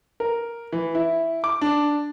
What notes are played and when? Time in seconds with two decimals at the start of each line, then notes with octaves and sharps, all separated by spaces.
0.20 A#4
0.72 E3
0.95 E4
1.44 D6
1.61 D4